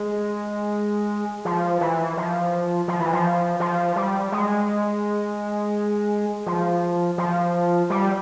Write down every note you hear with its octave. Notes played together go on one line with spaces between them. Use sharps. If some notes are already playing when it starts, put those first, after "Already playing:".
Already playing: G#3
F3
E3
F3
F3
E3
F3
F3
G3
G#3
F3
F3
G3